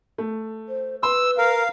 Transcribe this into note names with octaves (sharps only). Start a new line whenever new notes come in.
A3
C5
B4 C6 E6
A#4 F5